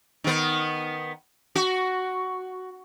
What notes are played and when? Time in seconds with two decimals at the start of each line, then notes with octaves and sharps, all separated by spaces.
0.24 D#3 B3
1.55 F#4